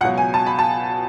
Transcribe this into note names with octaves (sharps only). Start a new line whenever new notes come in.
C#2 B2 F#3 F#5
G#5
A5
B5
A5